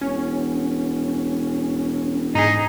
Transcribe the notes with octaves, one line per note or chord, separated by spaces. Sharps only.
E1 C#4
G#2 D#4 G#4 D#5